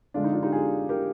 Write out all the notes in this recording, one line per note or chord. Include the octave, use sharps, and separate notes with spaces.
D3 F3 G#3 D4 F4
D#4
D4 F4
D#4 G4
F4 G#4
G4 A#4